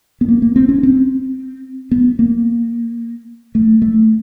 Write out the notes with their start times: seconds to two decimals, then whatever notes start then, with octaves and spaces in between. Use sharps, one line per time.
0.21 B3
0.29 A#3
0.42 A#3
0.56 C4
0.69 C#4
0.83 C4
1.91 B3
2.19 A#3
3.55 A3
3.82 A3